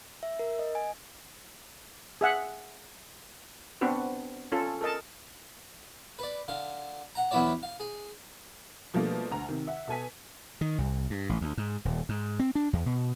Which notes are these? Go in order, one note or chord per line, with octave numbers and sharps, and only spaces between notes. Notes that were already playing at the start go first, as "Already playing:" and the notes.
E5
A#4
D#5
G#5
G#4 E5 F#5
B3 C4 D4 F#4 B4
C#4 F4 A4
A4 A#4 D#5 A5
B4 D5
D3 F5
F#5 A#5
E2 F#3 B3 E4 C#5 D5
F5
G#4
B2 F3 G3 A3 A#3 D4
D2 A#5
C3 D#3
E5 F#5
B2 A4 G#5 B6
D#3
C2
G2
A1
D2
G#2
D#1
G#2
C4
D4
E2
B2